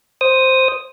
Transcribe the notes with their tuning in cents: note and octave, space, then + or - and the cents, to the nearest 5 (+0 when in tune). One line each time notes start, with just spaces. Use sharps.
C5 +0 D#6 +0